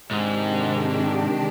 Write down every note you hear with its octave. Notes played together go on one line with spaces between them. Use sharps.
G#2 C3 D#3 G#3 D4 G4